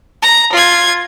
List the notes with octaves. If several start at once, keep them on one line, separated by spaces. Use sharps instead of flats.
A#5
F4 G#6